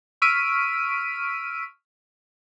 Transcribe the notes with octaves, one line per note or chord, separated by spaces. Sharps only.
C#6 E6 F6 B6 D7 D#7